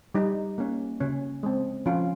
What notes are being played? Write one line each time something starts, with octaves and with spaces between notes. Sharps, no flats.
G3 D#4
A#3 C#4
C#3 C#4
G#3 C4
F3 C#4 F4